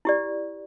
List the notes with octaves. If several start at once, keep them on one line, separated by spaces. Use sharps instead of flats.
E4 G4 D5